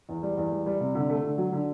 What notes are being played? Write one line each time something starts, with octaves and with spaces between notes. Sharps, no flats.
E2
G3
E2
G3
G3
C3
D3
A3
D3
F#3
D3